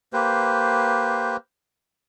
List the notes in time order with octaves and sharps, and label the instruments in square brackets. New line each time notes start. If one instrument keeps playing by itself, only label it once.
[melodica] A#3 G4 B4 C5